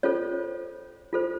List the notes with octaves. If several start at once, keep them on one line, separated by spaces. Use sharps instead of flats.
C#4 F4 A4 C5 C#5
F4 A4 C5